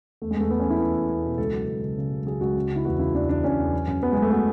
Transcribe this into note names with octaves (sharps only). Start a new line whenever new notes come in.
E2 A3
G#3
E2 A3
G#3 B3
C#4
E2 E4
E2
E2
E2
B2
C#2 A4
F#3
C#2
C#3
C#3
C#2
F#3 G#4
C#2 F#4
C#3
C#3 E4
E2 F#4
C#3 E4
E2 D4
E2 D4
E2 C#4
E2
F#3
F#2
F#3 B3
G#3
F#3
A3
F#3 B3